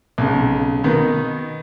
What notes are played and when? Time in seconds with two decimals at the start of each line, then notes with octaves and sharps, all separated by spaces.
0.18 B1 C#3
0.84 B2 D#3 B3